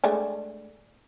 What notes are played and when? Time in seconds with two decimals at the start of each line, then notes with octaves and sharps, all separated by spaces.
0.04 G#3 A3 D4